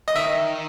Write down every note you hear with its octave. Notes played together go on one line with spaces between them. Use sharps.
D#5
D#3 E5